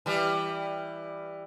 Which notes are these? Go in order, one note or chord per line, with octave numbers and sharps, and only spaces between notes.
E3 G3